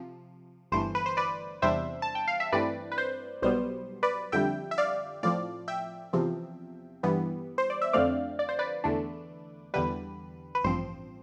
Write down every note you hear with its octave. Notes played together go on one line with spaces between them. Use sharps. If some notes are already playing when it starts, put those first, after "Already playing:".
Already playing: C3 F3
G1 G2 E3 A3 C5
B4
C5
B4 D5
E2 C3 G3 D4 C5 E5
A5
G5
F5
E5
G2 E3 A3 C4 B4 D5
B4
C5
B1 B2 G3 B3 C5
B4 D5
F2 D3 G3 E5 G5
E5
D5 F5
A2 F3 C4 D5 F5
E5 G5
E2 C3 F3 C4
G2 E3 G3 B3
C5
D5
E5
F2 D3 F3 A3 C4 D5 F5
D5
C5
B4 D5
E2 D3 A3 D4
E2 D3 G3 B4
B4
A1 G2 F3 C4 C5